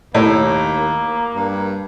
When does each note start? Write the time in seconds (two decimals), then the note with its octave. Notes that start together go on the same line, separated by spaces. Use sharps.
0.15 D#2 A2 A#3
1.34 G2